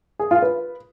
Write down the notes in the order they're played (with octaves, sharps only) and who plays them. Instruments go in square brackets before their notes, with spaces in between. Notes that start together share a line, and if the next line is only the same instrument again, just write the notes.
[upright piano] G#4
F4
B4